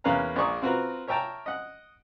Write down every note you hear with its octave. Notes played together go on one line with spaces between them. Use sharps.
E2 A#3 C#4 B4 F5 A#5
A#1 A#3 D5 C#6 D#6
C4 F4 F#4 A#4 B4
A#4 C#5 E5 G5 A5 A#5
D#5 F#5